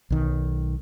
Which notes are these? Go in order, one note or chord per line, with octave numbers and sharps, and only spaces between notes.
B1 D#3